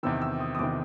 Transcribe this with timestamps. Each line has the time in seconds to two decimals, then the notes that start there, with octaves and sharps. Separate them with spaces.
0.03 E2 C3 D#3 E6
0.21 E6
0.40 D#6
0.55 D#6
0.59 E2 C3 D#3 D6